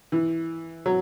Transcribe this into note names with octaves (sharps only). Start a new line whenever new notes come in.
E3
F#3